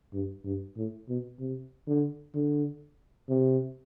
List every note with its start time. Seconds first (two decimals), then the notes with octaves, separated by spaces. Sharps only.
0.13 G2
0.45 G2
0.77 A2
1.08 B2
1.39 C3
1.87 D3
2.35 D3
3.29 C3